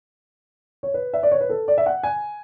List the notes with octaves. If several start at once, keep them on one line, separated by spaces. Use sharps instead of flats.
C#5
B4
E5
D5
C#5
B4
A4
D5
E5
F#5
G#5